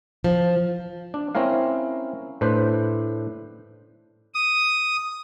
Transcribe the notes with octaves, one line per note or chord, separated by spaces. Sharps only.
F3
D4
C4 C#4 E4 A#4 F5
A2 D4 B4 C5
D#6